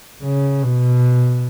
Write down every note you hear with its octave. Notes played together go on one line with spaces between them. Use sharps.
C#3
B2